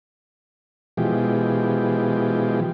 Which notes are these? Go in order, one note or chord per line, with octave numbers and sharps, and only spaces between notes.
B2 E3 F3 G#3 G4